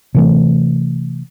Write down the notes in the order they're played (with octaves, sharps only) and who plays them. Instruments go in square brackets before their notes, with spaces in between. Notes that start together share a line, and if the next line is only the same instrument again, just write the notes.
[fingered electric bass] C3 E3 A3